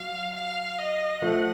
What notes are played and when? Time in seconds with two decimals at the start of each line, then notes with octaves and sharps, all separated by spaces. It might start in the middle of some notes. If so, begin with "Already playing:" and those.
Already playing: F#3 F5
0.35 F5
0.78 D#5
1.22 F3 A3 F#5